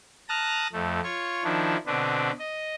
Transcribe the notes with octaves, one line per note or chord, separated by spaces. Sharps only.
A5 A#5 D#6 F6 F#6 A#6
F2 A3
F4 C#5 C#6
D#3 F3 D4 E4
B2 D3 C4 D4 B4
D#5